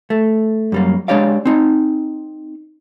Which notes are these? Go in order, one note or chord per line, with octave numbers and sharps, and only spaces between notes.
A3
F#2 G3 A#3
G#3 D4 G4 C#5 D5 F5
C4 D#4